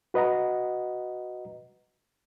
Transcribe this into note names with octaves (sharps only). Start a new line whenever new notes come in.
F#4 B4 D#5 F#5 A#5